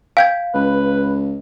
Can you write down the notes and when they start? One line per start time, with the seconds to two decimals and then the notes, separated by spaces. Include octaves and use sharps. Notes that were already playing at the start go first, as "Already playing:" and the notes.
0.17 F5 G5 G6 G#6
0.55 C#2 B4